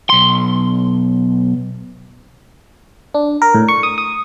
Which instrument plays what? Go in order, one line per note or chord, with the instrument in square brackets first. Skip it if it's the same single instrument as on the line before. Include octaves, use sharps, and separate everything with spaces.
[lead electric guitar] B1 C6
[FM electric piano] D4
A#4
A2
C#6
D#6
D#6